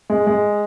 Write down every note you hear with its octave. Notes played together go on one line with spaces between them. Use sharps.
G#3
G#3